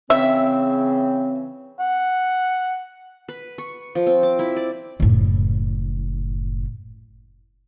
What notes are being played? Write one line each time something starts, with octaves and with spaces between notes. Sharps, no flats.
C#3 E3 C4 E5
F#5
B4
C#6
F3
C4
D6
E4
D5
F#1 A2